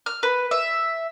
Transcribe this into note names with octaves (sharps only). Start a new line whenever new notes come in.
F6
B4
E5